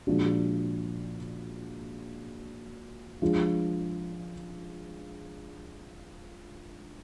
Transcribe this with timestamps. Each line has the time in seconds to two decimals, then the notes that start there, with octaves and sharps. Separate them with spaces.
0.07 A#2 F3 G#3 D4 F#4
3.22 F3 G#3 D4 F4